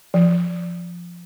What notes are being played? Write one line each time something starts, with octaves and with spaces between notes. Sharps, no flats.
F3